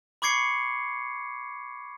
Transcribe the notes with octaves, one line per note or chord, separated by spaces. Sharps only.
B5 C#6 D6 G#6 C7 C#7